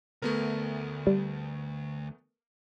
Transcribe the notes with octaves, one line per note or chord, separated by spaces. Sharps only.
D2 A3 B3 A#4
G3